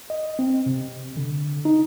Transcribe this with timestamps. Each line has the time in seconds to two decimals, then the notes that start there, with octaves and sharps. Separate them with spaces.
0.10 D#5
0.39 C4
0.66 C3
1.17 D3
1.65 D#4